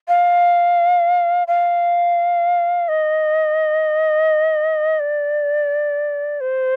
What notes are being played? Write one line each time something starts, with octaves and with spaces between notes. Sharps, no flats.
F5
F5
D#5
D5
C5